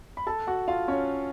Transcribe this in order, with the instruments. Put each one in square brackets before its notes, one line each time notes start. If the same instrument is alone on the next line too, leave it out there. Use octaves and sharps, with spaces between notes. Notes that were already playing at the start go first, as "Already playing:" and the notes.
[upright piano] B5
A4 A5
F#4 F#5
F4 F5
C#4 C#5